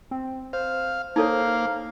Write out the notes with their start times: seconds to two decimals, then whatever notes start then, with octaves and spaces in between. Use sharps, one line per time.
0.11 C4
0.53 C5 F5
1.16 A#3 D#4 A4 C#5 F5